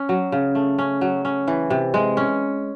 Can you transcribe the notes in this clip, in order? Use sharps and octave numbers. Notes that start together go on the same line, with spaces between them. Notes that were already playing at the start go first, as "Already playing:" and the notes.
Already playing: C#4
F#3
C#3
A3
C#4
F#3
C#4
E3
C3
G#3
C#4